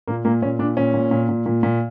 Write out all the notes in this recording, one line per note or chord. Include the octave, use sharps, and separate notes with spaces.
A#2 A#3
A#2 A#3
A#2 C#4
A#2 D4
A#2 C#4
A#2
A#2
A#2
A#2
A#2